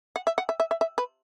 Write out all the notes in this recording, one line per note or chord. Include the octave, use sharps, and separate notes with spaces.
F#5
E5
F#5
E5
E5
E5
E5
B4